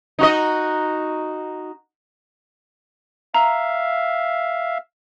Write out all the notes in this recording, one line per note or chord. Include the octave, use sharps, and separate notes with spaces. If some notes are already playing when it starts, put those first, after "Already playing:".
D#4 F#4 D#5
E5 F5 A#5